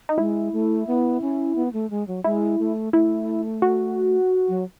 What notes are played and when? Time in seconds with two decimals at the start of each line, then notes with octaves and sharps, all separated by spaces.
0.09 D#4
0.18 G#3 E4
0.53 A3
0.87 B3
1.21 C#4
1.56 B3
1.73 A3
1.90 G#3
2.08 F#3
2.24 G#3 E4
2.59 A3
2.93 A3 E4
3.62 F#4
4.48 F#3